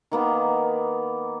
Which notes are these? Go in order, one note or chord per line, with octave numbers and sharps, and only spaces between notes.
D#3 A#3 B3